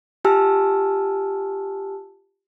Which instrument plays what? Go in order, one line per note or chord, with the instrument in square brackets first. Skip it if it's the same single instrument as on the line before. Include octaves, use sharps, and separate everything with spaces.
[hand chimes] F4 G4 G#5 A5 E6 F6